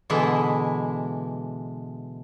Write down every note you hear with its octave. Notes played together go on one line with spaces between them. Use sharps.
B2 D3 E3 G#3 E4